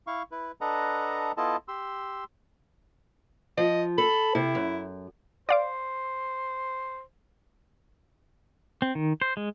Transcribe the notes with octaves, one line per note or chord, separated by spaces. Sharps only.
E4 F5 C#6
E4 B4
D4 A4 B4 D#5 F#5 A#5
B3 E4 F4 A4 D#5 A5
G4 C6 E6
F3 D#5
A4 B5
C3 E4
F#2
C5 D5 F5 D6
C4
D#3
C5
G#3